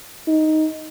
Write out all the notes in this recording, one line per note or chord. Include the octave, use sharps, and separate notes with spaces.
D#4